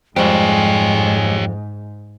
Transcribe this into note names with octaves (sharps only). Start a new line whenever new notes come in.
F2 G#2 G3 G#3 G4 C#5